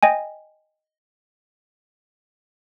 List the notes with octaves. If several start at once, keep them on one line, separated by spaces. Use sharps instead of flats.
D#5 G5 G#5